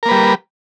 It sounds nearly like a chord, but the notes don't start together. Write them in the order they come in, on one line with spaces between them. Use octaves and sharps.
A#4 A#3 B4 G3